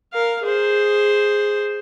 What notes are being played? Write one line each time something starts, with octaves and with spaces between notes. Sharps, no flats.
A#4 F5
G#4 C5